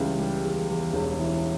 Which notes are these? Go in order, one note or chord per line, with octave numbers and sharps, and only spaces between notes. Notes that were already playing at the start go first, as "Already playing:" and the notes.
Already playing: C#2 E3 G3
G3
E2
E2
E1
E3